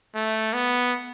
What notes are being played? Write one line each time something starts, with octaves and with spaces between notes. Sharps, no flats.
A3
B3